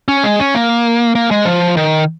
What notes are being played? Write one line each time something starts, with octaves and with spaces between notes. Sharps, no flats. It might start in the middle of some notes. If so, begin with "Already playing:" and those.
C#4
G#3
C#4
A#3
A#3
G#3
F3
D#3